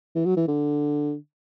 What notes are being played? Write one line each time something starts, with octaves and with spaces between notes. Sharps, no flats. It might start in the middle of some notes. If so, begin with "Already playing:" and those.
E3
F#3
E3
D3